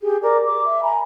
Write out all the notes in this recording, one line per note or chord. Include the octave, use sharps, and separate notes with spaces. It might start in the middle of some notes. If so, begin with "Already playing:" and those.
G4 G#4
A#4 D5 D6
D6
E5
G#5 A#5 B5